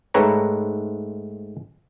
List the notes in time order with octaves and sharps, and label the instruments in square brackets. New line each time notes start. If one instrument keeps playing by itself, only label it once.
[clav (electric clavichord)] G#2 A3 C4 B4 C#5 A#5